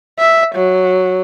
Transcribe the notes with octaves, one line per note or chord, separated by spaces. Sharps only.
E5
F#3